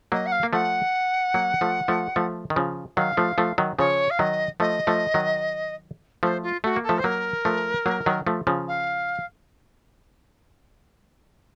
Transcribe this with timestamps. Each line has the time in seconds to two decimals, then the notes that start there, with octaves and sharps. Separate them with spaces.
0.12 F#3 A#3 D#5
0.26 F#5
0.32 F5
0.43 A#3
0.53 F3 A3 F#5
1.34 F#3 A#3
1.61 F3 A3
1.88 F3 A3
2.16 F3 A3
2.50 D#3
2.56 C#3 F3
2.97 D#3 F#3 F5
3.17 F3 A3
3.38 F3 A3
3.58 D#3 F#3
3.79 C#3 F3 C#5
4.10 F5
4.19 D#3 F#3 D#5
4.60 F3 A3 D#5
4.87 F3 A3
5.14 D#3 F#3
6.23 F3 A3 C5
6.43 F4
6.64 A3 F#4
6.76 A#3
6.83 A4
6.89 F3 A3
6.99 C5
7.04 F#3 A#3 A#4
7.45 F3 A3
7.86 F#3 A#3
8.06 D#3 F#3
8.27 F3 A3
8.47 C#3 F3
8.68 F5